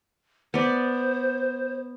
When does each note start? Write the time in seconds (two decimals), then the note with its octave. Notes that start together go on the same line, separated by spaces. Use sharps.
0.54 B3 C5 D5